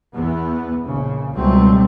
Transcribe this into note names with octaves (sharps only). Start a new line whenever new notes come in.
E2 B3
A#1 C#3
C#2 B2 F#3 G3 A3 C4